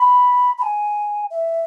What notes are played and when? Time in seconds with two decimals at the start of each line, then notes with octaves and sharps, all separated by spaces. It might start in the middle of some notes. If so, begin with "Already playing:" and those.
Already playing: B5
0.58 B5
0.62 G#5
1.31 E5